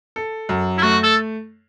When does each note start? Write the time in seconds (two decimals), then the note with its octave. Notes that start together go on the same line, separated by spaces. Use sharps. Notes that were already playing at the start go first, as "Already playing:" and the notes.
0.16 A4
0.49 F#2
0.78 E4
0.82 A3 F#4
1.03 A4